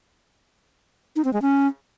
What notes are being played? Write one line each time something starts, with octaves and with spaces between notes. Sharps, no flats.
D#4
C4
G#3
C#4